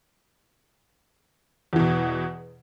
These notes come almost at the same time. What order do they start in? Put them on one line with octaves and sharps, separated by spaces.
E2 E3 B2